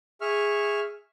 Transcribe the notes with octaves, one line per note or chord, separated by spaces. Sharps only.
G#4 E5 C#6 F6